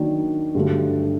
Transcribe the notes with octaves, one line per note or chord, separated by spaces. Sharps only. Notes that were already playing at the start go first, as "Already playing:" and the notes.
Already playing: D#3 F#3 A#3 D4
G2 D3 F#3 A3